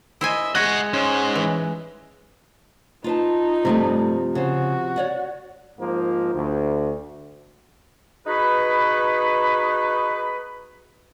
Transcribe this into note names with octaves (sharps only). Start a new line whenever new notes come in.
E4 C5 D#5 E5 G#5
G#3 F#4 D#5 F#5 F#6 G#6 A#6
G#2 C#4
E3
D#4 F4 B4 A5
G2 C3 F3 A3
C#3 F#4 C5
C#5 D5 F#5
G#2 F3 A#3
D2
D#4 F#4 G#4 B4